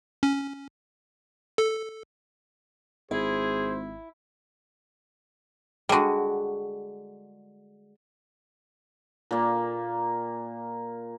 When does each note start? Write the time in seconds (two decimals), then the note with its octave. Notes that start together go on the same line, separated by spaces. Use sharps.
0.23 C#4
1.58 A4
3.11 G#1 E4 G#4 C5
5.89 D3 G3 G#3 F#4
9.31 A#2 A#3